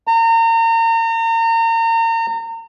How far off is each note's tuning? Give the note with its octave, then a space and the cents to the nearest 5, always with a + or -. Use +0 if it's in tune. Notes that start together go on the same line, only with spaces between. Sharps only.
A#5 -35